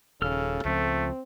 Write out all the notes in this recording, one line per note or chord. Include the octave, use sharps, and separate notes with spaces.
D#1 C#3 A4 F6
C#2 F3 A3 C4